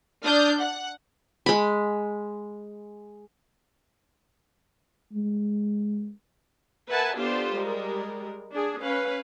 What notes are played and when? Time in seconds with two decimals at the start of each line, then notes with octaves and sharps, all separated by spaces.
0.24 D4 D#6 F6 G6
0.59 F#5
1.46 G#3 B5
5.13 G#3
6.89 A#4 B4 E5 F#5 G#5 A5
7.17 B3 D4 F4 G4 A4 C5
7.55 G3 G#3 A#4
8.53 D4 G#4
8.81 C#4 B4 F5